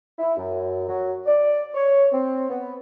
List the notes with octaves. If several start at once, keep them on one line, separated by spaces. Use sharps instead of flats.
E4
F#2
F#3
D5
C#5
C4
B3